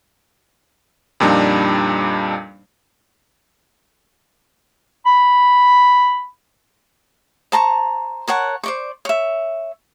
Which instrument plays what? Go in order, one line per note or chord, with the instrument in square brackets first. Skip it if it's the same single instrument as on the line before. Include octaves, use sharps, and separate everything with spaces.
[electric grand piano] F2 A#2 G3 D4 D#4
[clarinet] B5
[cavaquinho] C5 A5 A#5 C#6
A#4 C#5 F#5 A5
C5 D5 C#6
C#5 E5